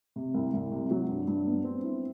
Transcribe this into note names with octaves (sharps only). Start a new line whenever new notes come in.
C3
C2
C2
C3
F#3
G2
G2
B3
C4
E4